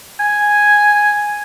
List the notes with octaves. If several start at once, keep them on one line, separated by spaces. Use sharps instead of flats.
G#5